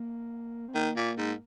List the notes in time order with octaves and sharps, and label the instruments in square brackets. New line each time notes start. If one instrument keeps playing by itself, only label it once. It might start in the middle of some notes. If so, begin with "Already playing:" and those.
Already playing: [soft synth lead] A#3
C4
[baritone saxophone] D#3 [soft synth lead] A#3
[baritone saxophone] A#2
G#2